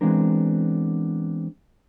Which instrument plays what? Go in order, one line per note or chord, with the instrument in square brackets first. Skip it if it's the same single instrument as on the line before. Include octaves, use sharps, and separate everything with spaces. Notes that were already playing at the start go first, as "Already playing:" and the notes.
[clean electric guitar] E3 G#3 B3 C4 D4 A#4